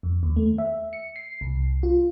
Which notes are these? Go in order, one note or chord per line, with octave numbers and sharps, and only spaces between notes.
F2
D#2
A3
E5
C#7
C7
C2
F4